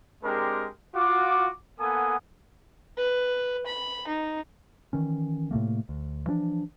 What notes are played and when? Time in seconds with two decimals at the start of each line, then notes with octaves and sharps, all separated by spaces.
0.22 G#3 C4 D4 G4 A#4
0.94 F4 F#4 D6
1.79 A#3 B3 A4 F#5 G#5 D#6
2.97 B4
3.66 B5
4.07 D#4
4.93 D#3 E3 C#4
5.51 A2 C3 A3 A#3
5.89 D2
6.26 E3 F3 C#4 D4